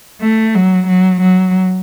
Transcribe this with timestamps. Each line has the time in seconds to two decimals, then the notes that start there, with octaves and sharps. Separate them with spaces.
0.21 A3
0.55 F#3
0.88 F#3
1.21 F#3